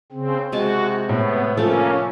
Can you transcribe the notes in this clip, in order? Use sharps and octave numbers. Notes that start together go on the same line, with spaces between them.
C#3 C4
C3 G#3 F#4 A5
A2 B3
F3 A3 A#3 C#4 A4